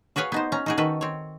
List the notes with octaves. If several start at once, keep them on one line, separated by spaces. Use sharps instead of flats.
F#4 G#4 B4 C#5 F5
B3 D#4 C5
C#4 A#5
D#4 F#4 G#4
D#3 F#4 A4 B4
C4 C#5